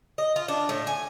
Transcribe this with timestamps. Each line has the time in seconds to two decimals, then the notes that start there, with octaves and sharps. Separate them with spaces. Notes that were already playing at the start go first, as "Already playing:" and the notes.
0.18 D#5
0.36 F4
0.48 D4
0.69 A2
0.87 G#5